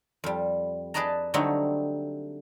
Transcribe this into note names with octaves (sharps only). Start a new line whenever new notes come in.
F2 G3
G#4 B4 D5 D#5 A5 A#5
D3 F#3 G3 A3 C4 D#4